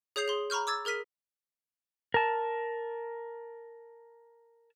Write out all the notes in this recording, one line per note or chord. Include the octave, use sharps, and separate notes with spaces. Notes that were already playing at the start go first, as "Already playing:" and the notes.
G#4 C#5 D#6 G6 C7 F7
G#4 C6
A#5 B5 C#6 F6 G6
D6 E6 G#6 A6
G#4 A#4 F6 B6 D#7
A#4 A5